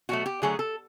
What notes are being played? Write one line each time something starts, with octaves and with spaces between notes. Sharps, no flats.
B2 F#3 A3 F#4
G4
D3 F#3 A3 G#4
A4